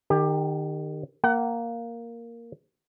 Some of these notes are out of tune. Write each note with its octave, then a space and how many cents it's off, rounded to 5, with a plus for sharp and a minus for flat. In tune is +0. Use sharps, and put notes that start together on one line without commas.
D#3 -30 G4 +20
A#3 +0 F#5 +30